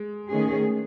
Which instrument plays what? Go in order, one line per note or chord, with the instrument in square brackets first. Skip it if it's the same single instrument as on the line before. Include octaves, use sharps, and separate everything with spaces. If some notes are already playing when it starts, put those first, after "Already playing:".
Already playing: [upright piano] G#3
[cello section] D#3 A3 C#4 G#4